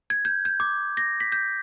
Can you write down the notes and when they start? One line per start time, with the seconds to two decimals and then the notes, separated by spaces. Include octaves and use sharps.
0.10 G#6
0.25 G6
0.45 G6
0.60 D6
0.97 A#6
1.20 B6
1.32 G6